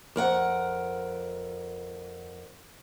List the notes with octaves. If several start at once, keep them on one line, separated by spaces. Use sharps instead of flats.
F2 A#4 F#5